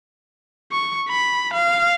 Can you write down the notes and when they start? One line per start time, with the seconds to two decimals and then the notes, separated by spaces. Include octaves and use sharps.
0.72 C#6
1.09 B5
1.54 F5